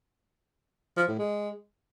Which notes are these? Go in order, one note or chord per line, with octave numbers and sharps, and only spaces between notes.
F3
A2
G#3